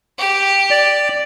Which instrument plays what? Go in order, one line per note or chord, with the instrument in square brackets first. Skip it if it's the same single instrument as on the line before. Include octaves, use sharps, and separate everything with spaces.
[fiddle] G4
[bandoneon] D5